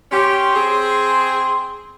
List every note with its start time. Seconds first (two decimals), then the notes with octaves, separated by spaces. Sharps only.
0.12 C#4 G4 C6
0.54 C4 G#4